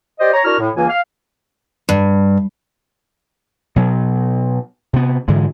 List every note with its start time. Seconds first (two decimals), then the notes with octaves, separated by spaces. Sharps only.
0.20 G4 C5 D5 D#5
0.34 C#5 A#5
0.45 D4 E4 F#4 A#4 F6
0.60 A2
0.76 C#2 E3 A#3 G#5
0.89 F5
1.89 G2
3.76 B2 F#3
4.93 C3 B3
5.28 G#2 D3 E3 G#3